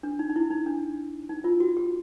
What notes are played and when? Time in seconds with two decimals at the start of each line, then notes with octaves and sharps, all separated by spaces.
0.03 D4
0.19 D#4
0.30 D#4
0.36 E4
0.50 D#4
0.66 D4
1.29 D#4
1.44 F4
1.60 F#4
1.77 G4